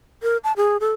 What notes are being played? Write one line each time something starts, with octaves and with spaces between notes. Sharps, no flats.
A#4
A5
G#4
A4